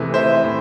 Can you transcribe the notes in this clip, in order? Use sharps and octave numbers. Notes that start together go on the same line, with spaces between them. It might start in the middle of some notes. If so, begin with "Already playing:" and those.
Already playing: C3 E3 A3 G#4 B4
C5 E5
A2